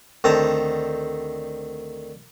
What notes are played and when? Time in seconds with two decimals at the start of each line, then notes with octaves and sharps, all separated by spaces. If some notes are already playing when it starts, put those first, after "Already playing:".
0.24 D2 D#3 C4 A5 A#5